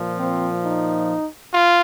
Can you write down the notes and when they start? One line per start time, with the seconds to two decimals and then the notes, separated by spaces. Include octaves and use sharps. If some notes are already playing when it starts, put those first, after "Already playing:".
Already playing: A#2 F3
0.18 C4
0.63 D#4
1.53 F4